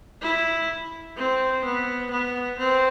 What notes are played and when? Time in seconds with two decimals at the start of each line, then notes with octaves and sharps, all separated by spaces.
0.22 E4
1.17 C4
1.65 B3
2.11 B3
2.59 C4